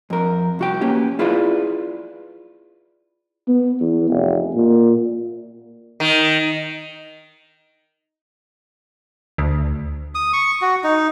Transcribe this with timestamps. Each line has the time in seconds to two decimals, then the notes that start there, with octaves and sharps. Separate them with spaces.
0.10 F2 A#4
0.59 C2 F#4 G5
0.81 A#3 B3 C#4 G4
1.19 E4 F4 G#4 B4 D5 F5
3.48 B3
3.80 E2
4.10 F1
4.55 A#2
6.00 D#3
9.38 D2
10.15 D#6
10.33 C#6
10.61 F#4
10.84 D#4